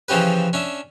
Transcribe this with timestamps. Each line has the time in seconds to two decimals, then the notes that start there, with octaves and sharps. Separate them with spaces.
0.08 C#3 E3 F3 C#4 G4 B4
0.53 C#4 D4 E5